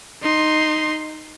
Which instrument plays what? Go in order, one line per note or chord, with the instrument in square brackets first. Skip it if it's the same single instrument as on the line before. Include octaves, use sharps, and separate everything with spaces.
[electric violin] D#4 C6